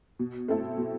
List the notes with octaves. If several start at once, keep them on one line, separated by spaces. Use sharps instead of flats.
B2
A3 C4 E4 A4
B2